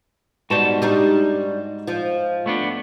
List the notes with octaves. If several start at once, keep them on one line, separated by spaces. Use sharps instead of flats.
G#2 G3 B3 F#4 A5
G3 D4 D#4
F3
A3 B3 D4